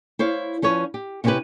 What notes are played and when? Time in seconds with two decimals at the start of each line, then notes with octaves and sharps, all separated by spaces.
0.19 E4 C5 C#5 F5
0.62 F3 C#4 B4 C#5
0.94 G4
1.24 C3 B3 C#4 E4 G4 B4